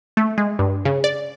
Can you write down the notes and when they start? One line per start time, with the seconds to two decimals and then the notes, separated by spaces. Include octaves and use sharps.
0.17 A3
0.38 G#3
0.59 G2
0.85 C#3
1.04 D5